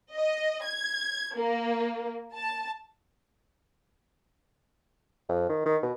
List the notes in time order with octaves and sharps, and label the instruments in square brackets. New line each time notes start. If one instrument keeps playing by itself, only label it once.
[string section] D#5
G#6
A#3
A5
[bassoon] F2
D#3
D#3
B2